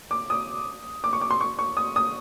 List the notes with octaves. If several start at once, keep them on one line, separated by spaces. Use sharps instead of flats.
D6
D#6
D6
C#6
D6
C6
C#6
C#6
D#6
D#6